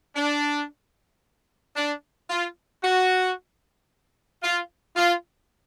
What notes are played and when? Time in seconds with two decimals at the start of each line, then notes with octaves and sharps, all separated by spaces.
0.16 D4
1.76 D4
2.30 F4
2.83 F#4
4.43 F4
4.96 F4